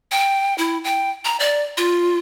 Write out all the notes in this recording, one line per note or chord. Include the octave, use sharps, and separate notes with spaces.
G5
E4
G5
A#5
D5
F4